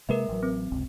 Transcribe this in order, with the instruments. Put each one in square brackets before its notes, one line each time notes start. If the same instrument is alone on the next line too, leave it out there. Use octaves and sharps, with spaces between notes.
[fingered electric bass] C3 G#3 A#3 [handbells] A#4 B4 E5
[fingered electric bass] A1 F#3
[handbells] C4
[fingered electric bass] F#1 C#2 C3